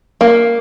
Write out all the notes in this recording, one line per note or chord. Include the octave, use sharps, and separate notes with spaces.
A#3